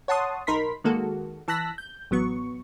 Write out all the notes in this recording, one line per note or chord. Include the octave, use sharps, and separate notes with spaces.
C#5 F#5 A5 C6 D#6
B1 D#4 A#4 B5 C6 B6
D#3 G#3 A#3 F#4 A4
E3 A5 E6 F#6 A#6 B6
G6
A1 F#3 B3 C#6